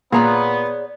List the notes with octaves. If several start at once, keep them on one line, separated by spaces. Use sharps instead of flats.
A#2 B3 G#4 C#5 D5 A#5